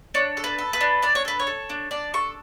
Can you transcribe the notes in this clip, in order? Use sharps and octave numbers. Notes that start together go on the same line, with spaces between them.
D4 C#5
A4
B4
A4
B4
D4
D4 D5
C#5
A4 B4
C#5
A4
D4
D4 D5
A4 C#6